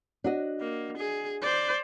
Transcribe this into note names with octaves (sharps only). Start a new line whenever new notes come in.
D4 F#4 D#5
A#3
G#4
C5 D5